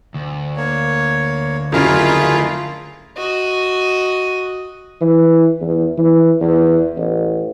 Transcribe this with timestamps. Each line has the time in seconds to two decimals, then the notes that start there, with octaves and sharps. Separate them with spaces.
0.14 D2
0.57 A#3 C#5
1.72 F2 C#3 F#3 A3 E4 F4 G#4 A#4
3.17 F#4 D#5
5.01 E3
5.61 E2
5.98 E3
6.41 E2
6.97 A1